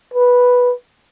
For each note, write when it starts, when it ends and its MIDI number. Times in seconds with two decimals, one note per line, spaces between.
0.14 0.72 71